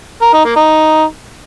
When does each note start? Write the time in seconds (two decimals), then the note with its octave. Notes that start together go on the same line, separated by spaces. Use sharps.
0.22 A#4
0.33 D#4
0.45 A#3
0.56 D#4